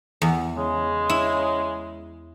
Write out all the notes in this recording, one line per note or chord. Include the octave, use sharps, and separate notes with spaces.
E2
C#3 G#3
E4